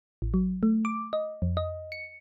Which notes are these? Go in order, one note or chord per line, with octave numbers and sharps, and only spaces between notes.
A1
F#3
A3
D6
D#5
F2
D#5
C#7